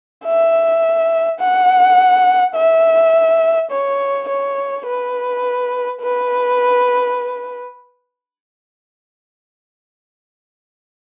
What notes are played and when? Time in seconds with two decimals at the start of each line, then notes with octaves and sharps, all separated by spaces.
0.25 E5
1.40 F#5
2.55 E5
3.71 C#5
4.29 C#5
4.86 B4
6.01 B4